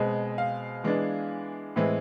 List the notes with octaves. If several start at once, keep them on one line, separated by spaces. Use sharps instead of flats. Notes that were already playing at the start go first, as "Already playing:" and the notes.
Already playing: B2 G#3 C4
F5
E3 G#3 B3 D4
A2 E3 G#3 C4